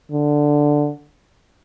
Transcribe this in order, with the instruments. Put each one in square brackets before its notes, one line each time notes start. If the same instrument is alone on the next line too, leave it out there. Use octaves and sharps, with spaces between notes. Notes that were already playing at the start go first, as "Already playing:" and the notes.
[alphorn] D3